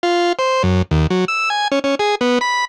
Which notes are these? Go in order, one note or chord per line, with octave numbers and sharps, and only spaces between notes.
F4
C5
F#2
D#2
F#3
E6
G#5
C#4
C#4
G#4
B3
B5